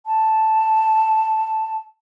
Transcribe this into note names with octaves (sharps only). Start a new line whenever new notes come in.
A5